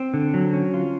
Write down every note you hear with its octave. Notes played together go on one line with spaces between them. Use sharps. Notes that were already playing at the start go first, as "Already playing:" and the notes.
Already playing: C4
D3
F#3
C#4
F4